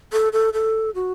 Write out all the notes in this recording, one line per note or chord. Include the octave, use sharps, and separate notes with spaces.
A4
A4
A4
F#4